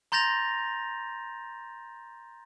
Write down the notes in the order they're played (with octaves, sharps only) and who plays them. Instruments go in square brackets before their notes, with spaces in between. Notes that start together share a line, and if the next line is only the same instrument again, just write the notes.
[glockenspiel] A#5 C6 G6 A6 A#6 F7